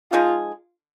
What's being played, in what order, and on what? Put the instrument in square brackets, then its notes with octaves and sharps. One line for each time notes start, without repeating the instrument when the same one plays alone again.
[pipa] F3 G#3 D#4 G#4 [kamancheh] F4